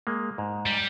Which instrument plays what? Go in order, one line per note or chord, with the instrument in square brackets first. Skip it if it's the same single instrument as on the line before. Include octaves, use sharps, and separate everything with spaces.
[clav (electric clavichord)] G#3 A#3
G#2
[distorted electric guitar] G3